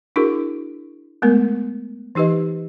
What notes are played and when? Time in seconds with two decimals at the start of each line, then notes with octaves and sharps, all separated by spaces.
0.16 D4 E4 F#4 G#4 A#4
1.22 G#3 A3 B3 A#4
2.15 E3 D#4 G4 B4 D#5